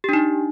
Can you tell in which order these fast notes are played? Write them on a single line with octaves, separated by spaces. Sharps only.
G4 D4 D#4